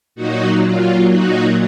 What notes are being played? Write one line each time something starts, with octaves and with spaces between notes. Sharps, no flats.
A#2 F#3 D#4 F#4
F4
D#4 F#4